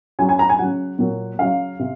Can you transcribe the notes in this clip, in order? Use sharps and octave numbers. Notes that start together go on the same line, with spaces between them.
C#3 F#3 G#5
G#5
A#5
G#5
C#3 F#3 F#5
A#2 F#3
C#3 F#3 F5
C3